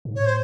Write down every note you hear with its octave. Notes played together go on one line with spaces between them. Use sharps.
G#2
A2 C#5
C5